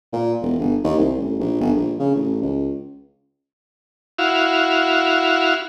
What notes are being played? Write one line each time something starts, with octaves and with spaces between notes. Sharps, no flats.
A#2
E1
G1
D#2
C2
A1
A#1
G1
A#1
C#3
A1
C#2
E4 F#4 F5